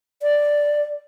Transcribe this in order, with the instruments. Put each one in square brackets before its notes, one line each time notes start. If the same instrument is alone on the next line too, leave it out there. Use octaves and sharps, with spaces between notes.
[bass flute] D5